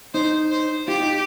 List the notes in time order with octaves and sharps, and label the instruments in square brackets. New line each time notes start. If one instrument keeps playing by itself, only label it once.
[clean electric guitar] D#4 [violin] C5
[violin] C5
[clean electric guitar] F4 [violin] G4
[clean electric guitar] D#4